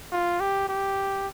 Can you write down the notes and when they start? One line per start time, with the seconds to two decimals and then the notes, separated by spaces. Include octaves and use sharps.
0.12 F4
0.40 G4
0.69 G4